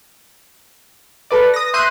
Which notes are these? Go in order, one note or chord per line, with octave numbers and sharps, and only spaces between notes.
A4 B4 D5
D#6 A#6
E5 C6 F#6 G6 D#7